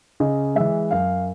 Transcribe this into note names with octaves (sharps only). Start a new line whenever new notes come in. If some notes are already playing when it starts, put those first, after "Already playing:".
C#3 D#5
E3 G#3 E5
F#2 F5